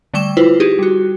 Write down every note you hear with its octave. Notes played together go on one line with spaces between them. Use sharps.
D3 G3 A3 G5 C#6 E7
E4 F4 B4 C5
D#4 G4 G#4
G3 F#4